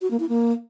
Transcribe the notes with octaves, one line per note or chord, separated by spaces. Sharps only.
F#4
A#3
E4
A#3